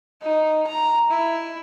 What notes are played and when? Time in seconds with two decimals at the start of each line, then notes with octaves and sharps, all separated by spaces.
0.22 D#4
0.67 A#5
1.11 E4